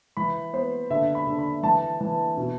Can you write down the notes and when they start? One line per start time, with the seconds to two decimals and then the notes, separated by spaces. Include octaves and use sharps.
0.17 E3 B5
0.53 B3 C5
0.90 D3 E5
1.15 B5
1.27 D3
1.39 B5
1.63 E3 A5
2.01 E3
2.37 B2